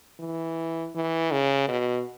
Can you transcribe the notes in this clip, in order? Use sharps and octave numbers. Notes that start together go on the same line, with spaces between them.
E3
E3
C#3
B2